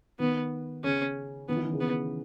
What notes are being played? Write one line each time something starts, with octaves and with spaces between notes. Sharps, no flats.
D#3 B3
C#3 C#4
D#3 B3
E3
D#3
C#3
B3